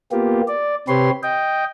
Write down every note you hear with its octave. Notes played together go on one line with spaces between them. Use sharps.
A#3 B3 F4 G4
D5
C3 C4 G4 B4 C#5 C6
D#5 G5